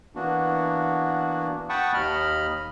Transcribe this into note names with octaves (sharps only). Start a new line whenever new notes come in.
E3 A#3 B3 D4 F#4
F#5 G5 A5 B5 C#6 D#6
D#2 D#5 B5 F6